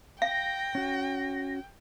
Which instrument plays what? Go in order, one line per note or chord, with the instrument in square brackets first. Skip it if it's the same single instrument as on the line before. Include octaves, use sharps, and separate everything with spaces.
[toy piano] F5 [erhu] G5 [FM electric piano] A#6
[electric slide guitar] C#4 F#4